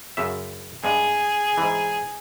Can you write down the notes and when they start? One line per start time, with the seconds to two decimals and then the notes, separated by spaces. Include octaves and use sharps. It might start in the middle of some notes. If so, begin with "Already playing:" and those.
0.17 F#2 C#3 E5
0.84 G2 G#3 G#4
1.58 G#2 E3